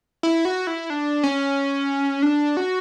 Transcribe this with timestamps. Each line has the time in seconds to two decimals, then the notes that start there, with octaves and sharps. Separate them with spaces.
0.23 E4
0.45 F#4
0.67 E4
0.90 D4
1.24 C#4
2.23 D4
2.57 F#4